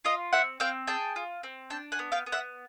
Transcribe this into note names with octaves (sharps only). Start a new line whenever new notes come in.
F4 D#5 F5
C4 E5 F#5
C4 F5 G5
G#4 G5 A5
F4
C4
D4 G5 A5
F#5 G#5
B3
F5 G5
B3
E5 F#5